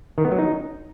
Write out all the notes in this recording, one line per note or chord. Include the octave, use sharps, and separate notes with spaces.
D#3
B3
F#3
D#4